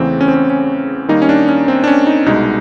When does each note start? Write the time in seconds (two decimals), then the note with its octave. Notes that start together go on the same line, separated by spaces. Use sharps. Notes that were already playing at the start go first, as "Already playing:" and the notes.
Already playing: E2 C#3 E3 A3 C4
0.21 C#4
0.28 C4
0.34 C#4
0.50 C#4
1.08 D#2 D#3 G3 A#3 D#4
1.22 C#4
1.29 D4
1.49 C#4
1.68 C4
1.84 D4
1.87 C#4
2.07 D#4
2.26 C2 B2 G#3 D#4